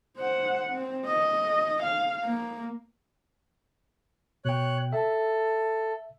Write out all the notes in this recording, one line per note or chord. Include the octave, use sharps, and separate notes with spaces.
C5 F#5
C4
D#5
F5
A#3
B2 C#5 G5 F#6
A4 E5